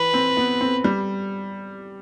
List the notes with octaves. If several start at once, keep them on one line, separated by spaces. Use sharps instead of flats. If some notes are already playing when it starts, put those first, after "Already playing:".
Already playing: E3 B4
C4
B3
C4
G3